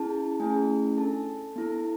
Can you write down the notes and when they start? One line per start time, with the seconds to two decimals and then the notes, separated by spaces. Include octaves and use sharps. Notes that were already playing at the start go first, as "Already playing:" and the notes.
Already playing: C#4 E4 G#4 A5
0.40 A3 C#4 E4 G#4 G#5
0.98 D4 A4 A5
1.56 B3 E4 A4